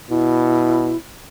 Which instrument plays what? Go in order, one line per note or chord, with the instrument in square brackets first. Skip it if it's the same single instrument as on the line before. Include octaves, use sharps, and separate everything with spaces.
[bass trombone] B2 [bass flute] E4